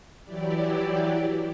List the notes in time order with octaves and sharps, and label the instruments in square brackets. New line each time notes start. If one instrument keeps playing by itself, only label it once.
[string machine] E3 F#3 E4 G4 D5